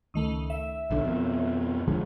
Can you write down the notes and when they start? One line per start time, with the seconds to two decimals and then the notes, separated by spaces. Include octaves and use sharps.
0.14 C#2 D#3 A3
0.50 E5
0.91 B1 D3
1.05 F2 B2
1.88 D3 F3 G#3